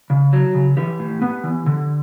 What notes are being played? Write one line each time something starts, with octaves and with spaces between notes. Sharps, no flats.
C#3
F#3
C#3
E3 G4
A2
B3
E3
D3